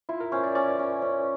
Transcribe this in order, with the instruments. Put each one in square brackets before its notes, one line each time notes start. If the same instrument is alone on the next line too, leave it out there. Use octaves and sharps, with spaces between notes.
[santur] E4 [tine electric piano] F4
[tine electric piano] A#4
[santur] C#4 [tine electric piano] C5
[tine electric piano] D5
[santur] C#4 [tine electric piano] D5
[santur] C#4
C#4